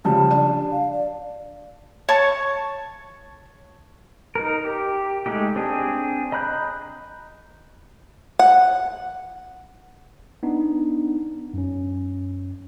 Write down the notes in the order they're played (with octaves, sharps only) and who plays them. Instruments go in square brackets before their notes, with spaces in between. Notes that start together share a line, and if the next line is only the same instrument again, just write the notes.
[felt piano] C#3 F3 G3 [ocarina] A5
[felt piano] D4
[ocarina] F5
D5
[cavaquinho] C#5 A5 C#6
[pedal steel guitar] D#4 A#4
G4
G#3 A3 D#4 G4
C4 D4 G#4
D#5 A#5 B5 F#6 G6
[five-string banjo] F#5
[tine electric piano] B3 D4 D#4
F#2 C#4